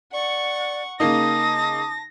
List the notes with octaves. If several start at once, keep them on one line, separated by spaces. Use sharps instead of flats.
D5 F#5 C#6
C#3 A#3 D#4 A5 D#6 A#6